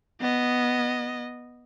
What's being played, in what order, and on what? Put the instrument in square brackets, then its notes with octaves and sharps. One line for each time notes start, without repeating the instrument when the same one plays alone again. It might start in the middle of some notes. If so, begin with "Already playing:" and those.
[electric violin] B3 D#5